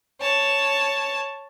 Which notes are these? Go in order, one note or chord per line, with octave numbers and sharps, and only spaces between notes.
C#5 A5